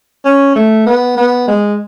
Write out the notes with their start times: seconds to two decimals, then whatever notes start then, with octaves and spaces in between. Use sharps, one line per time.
0.25 C#4
0.55 A3
0.86 B3
1.17 B3
1.48 G#3